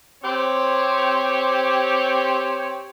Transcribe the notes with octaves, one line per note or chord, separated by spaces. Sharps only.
C4 G4 C#5